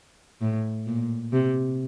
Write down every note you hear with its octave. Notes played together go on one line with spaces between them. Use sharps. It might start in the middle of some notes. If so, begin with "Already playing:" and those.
A2
A#2
C3